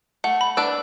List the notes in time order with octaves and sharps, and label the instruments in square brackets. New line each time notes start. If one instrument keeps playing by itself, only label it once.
[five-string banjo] A3 [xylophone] F#5
[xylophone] B5
[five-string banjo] D4 B4 D5 [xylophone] E6